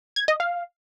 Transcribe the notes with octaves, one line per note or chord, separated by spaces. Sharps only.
G#6
D#5
F5